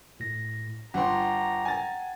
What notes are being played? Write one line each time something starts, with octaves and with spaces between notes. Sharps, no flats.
A2 A#6
G1 F#5 G5 A#5 C6
G#5 A6